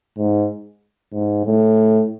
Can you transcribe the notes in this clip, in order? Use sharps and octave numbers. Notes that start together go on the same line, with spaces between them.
G#2
G#2
A2